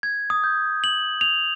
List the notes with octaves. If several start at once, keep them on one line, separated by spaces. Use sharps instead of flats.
G#6
D#6
G6
F#7
F7